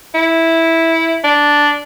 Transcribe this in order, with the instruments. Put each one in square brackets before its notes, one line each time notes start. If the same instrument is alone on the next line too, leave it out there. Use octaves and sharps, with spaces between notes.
[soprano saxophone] E4
D4